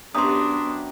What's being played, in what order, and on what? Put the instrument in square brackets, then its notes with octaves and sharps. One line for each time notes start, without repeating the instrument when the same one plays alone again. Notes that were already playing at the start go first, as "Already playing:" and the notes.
[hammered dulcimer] F#2 G4 A#5 [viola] B3 D4 [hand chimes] C6 D#6